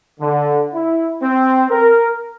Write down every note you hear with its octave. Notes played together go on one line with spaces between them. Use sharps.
D3
E4
C4
A#4